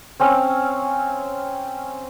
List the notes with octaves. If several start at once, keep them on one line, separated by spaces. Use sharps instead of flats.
C4 C#4 F5 E6